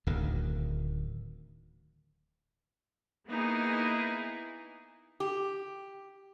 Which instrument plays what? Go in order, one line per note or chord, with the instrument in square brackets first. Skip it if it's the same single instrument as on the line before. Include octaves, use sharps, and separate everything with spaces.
[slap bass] D1 D2 D#3
[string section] A#3 B3 D#4 E4 G#4
[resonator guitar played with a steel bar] G4